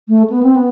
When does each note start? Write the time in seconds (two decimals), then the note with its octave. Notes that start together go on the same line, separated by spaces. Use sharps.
0.09 A3
0.30 B3
0.43 C4
0.56 B3